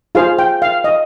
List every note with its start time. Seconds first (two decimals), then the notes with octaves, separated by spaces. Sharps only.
0.15 F4 G#4 C5 F5
0.39 G5
0.62 F5
0.84 D#5